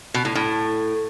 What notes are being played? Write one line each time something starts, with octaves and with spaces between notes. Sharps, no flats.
B2
A2
A2